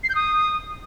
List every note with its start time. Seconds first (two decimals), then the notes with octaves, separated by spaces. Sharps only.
0.04 C7
0.09 G6
0.15 D#6